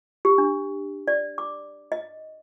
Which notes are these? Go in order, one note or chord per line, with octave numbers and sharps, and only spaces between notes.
G4
D4
D5
D6
D#5